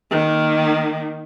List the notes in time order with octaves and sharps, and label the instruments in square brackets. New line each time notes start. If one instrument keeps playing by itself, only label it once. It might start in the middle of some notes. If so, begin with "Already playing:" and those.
[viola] D#3 A#3